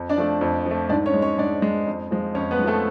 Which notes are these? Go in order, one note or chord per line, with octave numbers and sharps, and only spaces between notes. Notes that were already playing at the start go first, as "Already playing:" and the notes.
Already playing: F2
D4 D5
F3 A3
F2
F3 A3
G#2 D4 D5
C#4 C#5
G#3
C#4 C#5
G#2 D4 D5
G#3
F2
F3 G#3
F2 C#4 C#5
B3 B4
G#3
F3 A3 A4